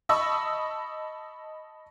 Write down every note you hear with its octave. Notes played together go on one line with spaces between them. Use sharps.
D#5 A5 B5 C#6 D#6 E6